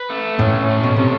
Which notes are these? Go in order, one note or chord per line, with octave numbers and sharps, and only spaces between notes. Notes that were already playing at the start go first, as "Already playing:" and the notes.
Already playing: B4
A3
A2 C#4
A3
B2
C3 C#4